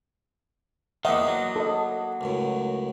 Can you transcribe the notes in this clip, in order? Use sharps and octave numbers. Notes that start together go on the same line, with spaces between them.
E2 D#3 A#3 D4 C5 D#5 E5 F#5
F#3
A4 D#5
C#2 F#2 A2